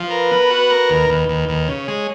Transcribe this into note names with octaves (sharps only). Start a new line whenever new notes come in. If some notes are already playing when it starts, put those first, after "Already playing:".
Already playing: F3
A#4 B4
B3
F#4
A#4
D#2
D#2
D#2
D#2
C#3 C#5
G#3